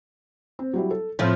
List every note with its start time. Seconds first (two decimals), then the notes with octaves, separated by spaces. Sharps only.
0.59 C4
0.74 F#3 G3 E4
0.91 A4
1.19 A2 F3 C4 E4 A4